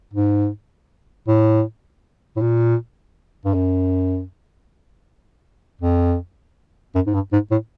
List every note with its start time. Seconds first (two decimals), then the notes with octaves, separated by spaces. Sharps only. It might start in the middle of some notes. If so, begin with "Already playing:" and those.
0.14 G#2
1.27 A2
2.36 A2
2.41 A#2
3.45 G2
3.54 F#2
5.82 F2
6.95 F#2
7.07 G#2
7.14 G2
7.33 G#2
7.51 A2